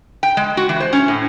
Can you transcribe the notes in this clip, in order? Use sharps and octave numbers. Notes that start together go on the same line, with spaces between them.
G5
G#3
F#4
E3
C5
C#4
A2